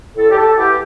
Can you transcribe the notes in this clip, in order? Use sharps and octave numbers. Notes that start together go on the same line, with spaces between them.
A2 A4
G4
A4
E3 B3 G4